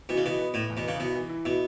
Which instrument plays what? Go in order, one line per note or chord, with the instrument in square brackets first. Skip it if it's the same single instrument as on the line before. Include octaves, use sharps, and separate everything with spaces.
[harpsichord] B2 [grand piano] E3
[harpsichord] C#3
[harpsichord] B2 [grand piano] B3
[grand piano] B3
[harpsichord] A2 [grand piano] B3
[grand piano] E2
[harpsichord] B2
[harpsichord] C#3 [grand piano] B3
[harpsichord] B2 [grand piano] E4
[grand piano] E3
E4
[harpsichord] B2 [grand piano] E4